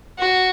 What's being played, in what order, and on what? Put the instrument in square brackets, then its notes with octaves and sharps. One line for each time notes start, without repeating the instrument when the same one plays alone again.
[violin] F#4